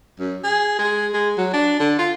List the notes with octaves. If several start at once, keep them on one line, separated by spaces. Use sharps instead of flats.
F#2
G#4
G#3
G#3
F#3
D4
D3
F4